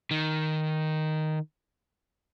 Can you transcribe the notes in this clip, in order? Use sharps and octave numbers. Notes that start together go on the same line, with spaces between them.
D#3